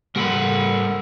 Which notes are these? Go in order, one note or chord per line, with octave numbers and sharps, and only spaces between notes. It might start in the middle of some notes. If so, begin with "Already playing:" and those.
G3 A4 A#4 F#5 B5